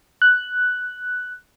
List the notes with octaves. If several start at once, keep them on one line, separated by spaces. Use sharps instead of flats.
F#6